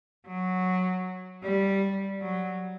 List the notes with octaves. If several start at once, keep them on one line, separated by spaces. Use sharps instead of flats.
F#3
G3
F#3